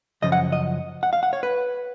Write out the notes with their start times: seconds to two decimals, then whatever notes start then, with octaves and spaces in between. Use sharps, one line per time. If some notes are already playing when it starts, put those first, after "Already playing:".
0.22 F#2 C#3 F3 D#5
0.32 F#5
0.52 D#5
1.03 F#5
1.13 F5
1.23 F#5
1.33 C#5
1.43 B4